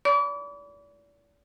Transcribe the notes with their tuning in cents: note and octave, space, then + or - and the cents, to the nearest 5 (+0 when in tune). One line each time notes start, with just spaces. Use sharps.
D5 -35 B5 +0 D6 -40